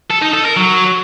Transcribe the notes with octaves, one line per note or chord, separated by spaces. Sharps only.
A4
D#4
A4
A#4
F#3